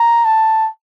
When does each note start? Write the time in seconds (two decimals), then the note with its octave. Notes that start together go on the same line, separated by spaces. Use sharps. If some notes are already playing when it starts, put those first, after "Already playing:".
Already playing: A#5
0.25 A5